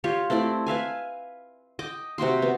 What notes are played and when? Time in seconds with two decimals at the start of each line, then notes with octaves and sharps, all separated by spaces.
0.04 F4 G4 C#5
0.30 A3 C4 E4 D5
0.66 B4 E5 F5 G#5
1.79 D#5 G5 D6
2.18 C3 F#4 G5 C6
2.42 B3